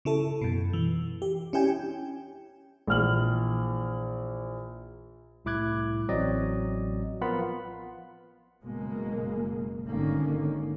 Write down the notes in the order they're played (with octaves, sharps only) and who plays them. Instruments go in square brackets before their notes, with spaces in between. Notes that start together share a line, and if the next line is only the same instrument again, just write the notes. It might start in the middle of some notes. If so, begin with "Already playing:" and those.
[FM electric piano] C#3 E4 A4
F#2 B2
E3
G4
C#4 D4 E4 G4 G5 G#5
[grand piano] A#1 E3 F6 F#7
[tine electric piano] C2 A2 E4 D6 F#6 G#6
A1 F#3 C4 D5 D#5
F3 B3 F4 A#4 F#5 B5
[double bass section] F#1 B2 G#3 A#3
G#1 D3 D#3 A#3 C#4